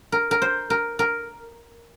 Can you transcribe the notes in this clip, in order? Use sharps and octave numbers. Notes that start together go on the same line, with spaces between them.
A#4
A#4
C5
A#4
A#4